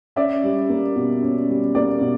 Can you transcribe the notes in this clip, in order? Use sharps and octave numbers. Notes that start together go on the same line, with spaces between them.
C#4 D5 E5
G3
A#3
B2
C#4
G3
A#3 D5
B2